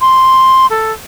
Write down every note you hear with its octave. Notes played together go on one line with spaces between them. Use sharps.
C6
A4